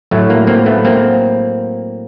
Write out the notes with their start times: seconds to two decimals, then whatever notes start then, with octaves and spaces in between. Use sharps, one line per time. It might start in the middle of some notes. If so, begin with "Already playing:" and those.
0.11 A2 F#3 A3
0.30 A#3
0.47 A#3 C4
0.66 A3 B3
0.85 A#3 C4